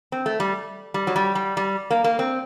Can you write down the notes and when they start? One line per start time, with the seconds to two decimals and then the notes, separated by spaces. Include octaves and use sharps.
0.12 C4
0.26 A3
0.40 G3
0.94 G3
1.07 F#3
1.16 G3
1.35 G3
1.57 G3
1.90 A#3
2.04 A#3
2.19 C4